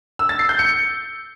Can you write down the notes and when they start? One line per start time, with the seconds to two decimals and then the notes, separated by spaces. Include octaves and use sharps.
0.19 E6
0.29 A6
0.39 C7
0.49 G6
0.59 C#7